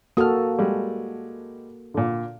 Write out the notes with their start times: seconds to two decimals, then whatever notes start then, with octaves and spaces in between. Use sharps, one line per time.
0.17 A#3 F#4 A4 D#6 F6
0.58 G3 G#3
1.94 A#2 D3